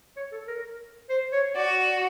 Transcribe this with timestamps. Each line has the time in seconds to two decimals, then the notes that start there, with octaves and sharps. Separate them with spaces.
0.17 C#5
0.32 A4
0.48 A#4
1.09 C5
1.32 C#5
1.55 F#4 D5